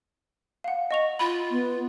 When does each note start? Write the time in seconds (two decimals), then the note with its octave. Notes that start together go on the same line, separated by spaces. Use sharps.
0.64 F5 F#5
0.91 D#5 C#6 F7
1.19 F4 B5
1.51 B3